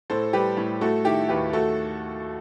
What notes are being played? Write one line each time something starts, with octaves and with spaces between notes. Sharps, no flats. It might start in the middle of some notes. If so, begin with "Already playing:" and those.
A2 A4 C5
G3 G4 B4
A2
A3 F#4 A4
D#3 E4 G4
D#2 G4 B4
A3 F#4 A4